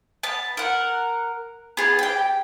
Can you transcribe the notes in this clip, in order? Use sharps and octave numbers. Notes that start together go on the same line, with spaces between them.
B3 A5
A#4 F#5
B3 G#4
G4 G5